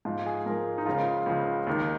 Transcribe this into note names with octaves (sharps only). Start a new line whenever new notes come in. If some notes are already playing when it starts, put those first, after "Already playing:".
G#2 F3 F4
G#4
G#2 F3 A#4
D#4
C#2 C#3 F3 F4
C#2 C#3 F3
D#2 D#3